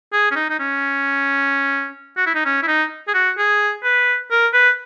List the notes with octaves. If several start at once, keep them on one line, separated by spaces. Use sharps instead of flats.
G#4
C#4
D#4
D#4
C#4
F#4
E4
D#4
C#4
E4
D#4
G#4
F#4
G#4
B4
A#4
B4